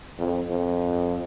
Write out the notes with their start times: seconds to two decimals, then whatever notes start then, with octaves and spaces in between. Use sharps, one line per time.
0.18 F2
0.50 F2